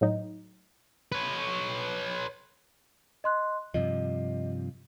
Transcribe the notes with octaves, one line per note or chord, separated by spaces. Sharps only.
A2 F#3 D#4
B4 C#5
D#5 C6 F#6
G2 C3 F3 D#5